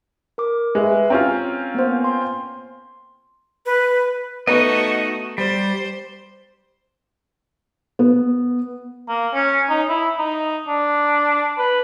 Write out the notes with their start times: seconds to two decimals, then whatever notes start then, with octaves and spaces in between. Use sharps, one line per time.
0.38 A#4 D6
0.75 G#3 B4 E5
1.10 C4 C#4 F4 A#5
1.74 A#3 B3 C5
2.04 C6
3.66 B4
4.47 A3 B3 D#4 F#4 D#5
5.38 G3 C5
7.99 B3
9.09 A#3
9.34 C#4
9.69 D#4
9.89 E4
10.19 D#4
10.68 D4
11.58 B4